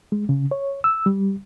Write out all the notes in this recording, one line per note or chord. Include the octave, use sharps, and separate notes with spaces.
G#3
C#3
C#5
E6
G3